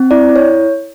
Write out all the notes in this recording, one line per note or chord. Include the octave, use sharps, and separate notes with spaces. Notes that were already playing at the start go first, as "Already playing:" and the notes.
Already playing: C4
E4 D5
E4
C#5